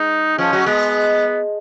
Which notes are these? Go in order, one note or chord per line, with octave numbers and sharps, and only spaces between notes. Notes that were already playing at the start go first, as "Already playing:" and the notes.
Already playing: G#3 D#4
F3 C#4
F#3
G#3 B3